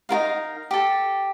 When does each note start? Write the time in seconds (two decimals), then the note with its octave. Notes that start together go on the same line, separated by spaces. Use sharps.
0.09 D#4 F4 A#4 F5
0.71 G4 A4